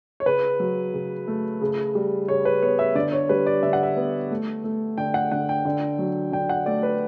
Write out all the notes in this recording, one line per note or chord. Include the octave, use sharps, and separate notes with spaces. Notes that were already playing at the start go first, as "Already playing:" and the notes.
C#5
C#3 B4
F#3
C#3
A3
C#3
G3
C#3 C#5
B4
B3 C#5
E5
D3 D5
D5
C#5
G3 B4
D5
D3 E5
F#5
E5
B3
A3
A3
D3 G5
F#5
D3 F#5
G5
D3
F#3
D3 G5
F#5
A3 D5
B4